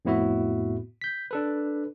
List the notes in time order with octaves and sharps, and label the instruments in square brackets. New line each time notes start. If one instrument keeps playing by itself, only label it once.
[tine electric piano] F2 A2 B3 E4 F#4 E5
G6 B6
D4 A4 B4